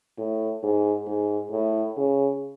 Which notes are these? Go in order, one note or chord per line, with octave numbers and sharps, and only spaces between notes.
A2
G#2
G#2
A2
C#3